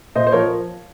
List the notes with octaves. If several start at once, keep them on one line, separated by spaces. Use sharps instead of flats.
A#2 C5 D#5
C5
F3 A#4 C#5